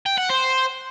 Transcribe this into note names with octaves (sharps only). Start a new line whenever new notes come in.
G5
F#5
C5